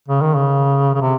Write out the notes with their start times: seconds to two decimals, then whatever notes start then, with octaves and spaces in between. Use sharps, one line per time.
0.08 C#3
0.21 D#3
0.35 C#3
0.95 C#3
1.02 C3